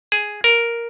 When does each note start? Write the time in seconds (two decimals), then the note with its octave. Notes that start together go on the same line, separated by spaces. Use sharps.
0.12 G#4
0.44 A#4